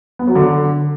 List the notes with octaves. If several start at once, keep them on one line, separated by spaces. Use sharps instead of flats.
B3
F#3
D3